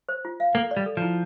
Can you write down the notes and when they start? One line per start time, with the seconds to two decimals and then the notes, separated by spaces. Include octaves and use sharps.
0.09 C5
0.25 F4
0.40 F5
0.55 A#3 A4
0.71 D5
0.77 G3
0.86 A4
0.97 F3
1.02 E4